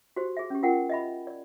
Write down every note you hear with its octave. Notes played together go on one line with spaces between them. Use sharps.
F#4 G4 C5
G#4 E5
C#4 G4
F4 A#4 F#5 G5
D#5 E5 B5
D5